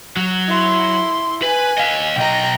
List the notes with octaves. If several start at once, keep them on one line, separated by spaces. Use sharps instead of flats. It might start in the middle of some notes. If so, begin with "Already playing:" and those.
F#3
E4 C6
B4 G#5
D#5 F5
B1 D#5 G5 A#5